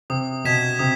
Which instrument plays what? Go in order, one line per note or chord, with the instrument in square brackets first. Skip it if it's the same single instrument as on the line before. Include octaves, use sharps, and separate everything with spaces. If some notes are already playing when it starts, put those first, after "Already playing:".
[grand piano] C3 [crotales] D#6
[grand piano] B2 [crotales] G#6 B6 E7
[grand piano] C3 [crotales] D#6